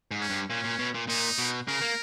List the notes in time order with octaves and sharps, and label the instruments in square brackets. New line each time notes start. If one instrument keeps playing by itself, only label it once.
[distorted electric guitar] G#2
[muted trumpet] C#4
[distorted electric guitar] G2
[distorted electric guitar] A#2 [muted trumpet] C#4
[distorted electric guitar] A#2
B2
A#2
[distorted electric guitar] A#2 [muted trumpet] D#4
[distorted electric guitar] B2
[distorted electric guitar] C#3 [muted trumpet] A#4
[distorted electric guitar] A#3